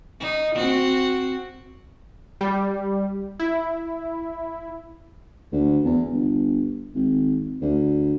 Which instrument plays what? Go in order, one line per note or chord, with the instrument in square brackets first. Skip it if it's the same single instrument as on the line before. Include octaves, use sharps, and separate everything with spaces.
[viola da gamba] D#4
C4 F#4
[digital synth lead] G3
E4
[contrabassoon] D2
E2
G1
G#1
D2